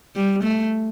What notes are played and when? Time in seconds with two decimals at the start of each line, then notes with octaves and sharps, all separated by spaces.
0.16 G3
0.44 A3